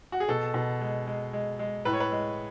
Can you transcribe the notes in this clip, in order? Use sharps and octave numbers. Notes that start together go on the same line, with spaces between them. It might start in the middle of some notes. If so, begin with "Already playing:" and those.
F#4
G#4
B2 A4
B2
G#3
G#3
G#3
G#3
A2 B4
C#5
B4
G#3